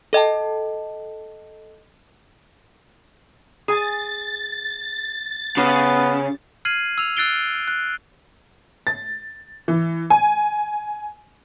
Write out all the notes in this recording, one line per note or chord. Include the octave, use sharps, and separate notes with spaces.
A4 D#5 G5 A5
G#4 G#5 A6
C#3 B3 G4
F6 G#6 C7 D#7 F#7
E6 F7
E6 F#6 A6 C7 D7 G7
F#6
A6
E3
G#5